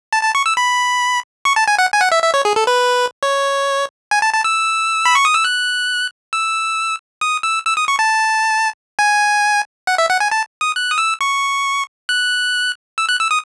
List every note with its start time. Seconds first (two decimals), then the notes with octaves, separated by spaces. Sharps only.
0.13 A5
0.23 A5
0.35 C#6
0.46 E6
0.57 B5
1.45 C#6
1.56 A5
1.68 G#5
1.78 F#5
1.93 G#5
2.01 F#5
2.12 E5
2.23 E5
2.34 C#5
2.45 G#4
2.56 A4
2.67 B4
3.23 C#5
4.11 G#5
4.22 A5
4.34 A5
4.44 E6
5.05 B5
5.15 C#6
5.25 D#6
5.34 E6
5.45 F#6
6.33 E6
7.21 D#6
7.43 E6
7.66 E6
7.77 D#6
7.88 C#6
7.99 A5
8.99 G#5
9.87 F#5
9.98 E5
10.10 F#5
10.20 G#5
10.31 A5
10.61 D#6
10.76 F#6
10.91 D#6
10.98 E6
11.21 C#6
12.09 F#6
12.98 E6
13.09 F#6
13.20 E6
13.31 D#6